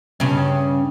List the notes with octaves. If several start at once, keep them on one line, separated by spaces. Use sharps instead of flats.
G2 C#3